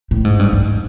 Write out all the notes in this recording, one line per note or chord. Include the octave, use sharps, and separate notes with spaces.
A2
G#2
G2
G#2